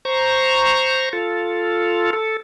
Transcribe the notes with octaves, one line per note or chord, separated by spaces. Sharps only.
C5 A#5 C#6
F4 A4
A4